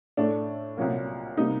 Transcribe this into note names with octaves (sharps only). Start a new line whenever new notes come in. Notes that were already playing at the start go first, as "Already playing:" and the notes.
A2 A3 D4
C2 A#2 F#3 A#3
C3 G3 A#3 D#4